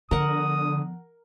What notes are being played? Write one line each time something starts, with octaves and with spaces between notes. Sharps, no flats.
D3 F3 B3 A#4 F#5 D#6